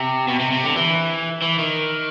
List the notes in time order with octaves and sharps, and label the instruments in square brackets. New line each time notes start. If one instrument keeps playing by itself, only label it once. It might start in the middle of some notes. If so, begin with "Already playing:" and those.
Already playing: [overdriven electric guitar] C3
B2
C3
C3
D3
E3
E3
D#3